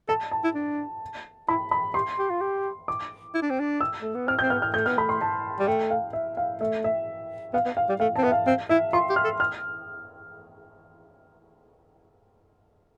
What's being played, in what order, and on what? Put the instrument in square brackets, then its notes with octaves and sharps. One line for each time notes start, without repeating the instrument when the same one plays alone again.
[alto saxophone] A4 [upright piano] A5
[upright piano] A5
[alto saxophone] E4
D4
[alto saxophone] E4 [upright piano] B5
[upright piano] B5
[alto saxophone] G4 [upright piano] C6
[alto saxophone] G4
F4
G4
[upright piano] D6
[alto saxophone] E4
D4
C4
D4
[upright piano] E6
[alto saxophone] A3
B3
[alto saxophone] C4 [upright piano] F6
[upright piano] G6
[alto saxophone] C4
[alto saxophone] B3 [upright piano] F6
[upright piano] F6
[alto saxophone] A3 [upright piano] G6
[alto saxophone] B3 [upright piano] F6
[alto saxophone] A3 [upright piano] B5
[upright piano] C6
A5
[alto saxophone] G3
[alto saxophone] A3 [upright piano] G5
[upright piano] F5
E5
F5
[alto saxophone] A3 [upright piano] E5
[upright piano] E5
[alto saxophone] B3 [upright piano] F5
[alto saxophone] B3
[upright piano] F5
[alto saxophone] G3
[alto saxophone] A3 [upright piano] F5
[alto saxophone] C4 [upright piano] A5
[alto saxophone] B3 [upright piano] E5
[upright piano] F5
[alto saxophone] C4 [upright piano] F5
[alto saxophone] E4 [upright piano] E5
[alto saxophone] F4 [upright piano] C6
[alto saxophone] G4
[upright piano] F6
[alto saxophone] A4
[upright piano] F6